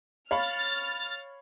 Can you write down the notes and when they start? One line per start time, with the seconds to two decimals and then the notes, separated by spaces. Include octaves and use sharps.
0.31 C#5 F5 B5 F6 A6